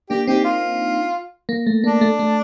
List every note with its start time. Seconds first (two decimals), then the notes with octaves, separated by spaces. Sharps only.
0.10 A#3 D4 G4
0.27 C4 D#4 G4
0.45 F4
1.49 A#3
1.67 A3
1.84 A#3 D4
2.01 A3
2.19 A3